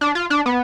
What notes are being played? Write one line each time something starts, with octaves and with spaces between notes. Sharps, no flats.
D4
F4
D4
B3